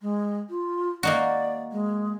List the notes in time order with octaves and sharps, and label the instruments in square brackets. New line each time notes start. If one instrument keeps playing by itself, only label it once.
[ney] G#3
F4
[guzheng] A#3 D#4 F#4 [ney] D5
[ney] G#3